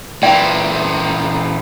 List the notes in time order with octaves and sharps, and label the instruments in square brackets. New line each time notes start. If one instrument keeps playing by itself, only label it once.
[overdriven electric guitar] A#2 E3 [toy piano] D5 F5 G5